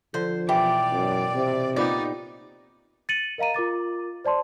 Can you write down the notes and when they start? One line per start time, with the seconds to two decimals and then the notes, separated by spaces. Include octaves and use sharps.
0.14 D3 F3 C5
0.49 B2 E3 G4 D5
0.93 F#2
1.36 C3
1.76 A#2 B3 D#4 G4 D5
3.09 A6 C#7 D#7 F#7
3.38 A#4 D#5 F5 A#5 D#7
3.54 F4 A#4 D6 A6
4.25 C5 D5 A5 C6